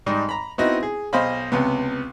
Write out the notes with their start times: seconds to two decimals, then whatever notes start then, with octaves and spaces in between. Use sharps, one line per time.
0.06 G#2 G3 D#4
0.29 A#5 B5
0.58 B3 C4 D#4 E4 F#4 D#5
0.83 G#4
1.13 B1 C5 D#5 F5 B5
1.52 C#2 C3 B3